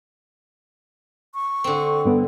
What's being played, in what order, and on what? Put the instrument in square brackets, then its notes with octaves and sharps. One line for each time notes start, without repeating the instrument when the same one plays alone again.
[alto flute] C#6
[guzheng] D3 C4
[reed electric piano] G2 B3